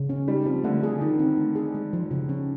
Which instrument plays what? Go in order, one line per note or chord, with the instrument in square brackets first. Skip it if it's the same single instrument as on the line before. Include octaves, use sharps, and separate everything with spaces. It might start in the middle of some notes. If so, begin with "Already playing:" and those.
Already playing: [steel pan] C#3
C#4
[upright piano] G3 [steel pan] D#4
[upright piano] F3 [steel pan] C4
[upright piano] D3 [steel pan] A3
[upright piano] D3 [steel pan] G#4
[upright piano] D#3 [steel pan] D#4
[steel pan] C4
A3
G#4
G#3
F3
C#3
C#4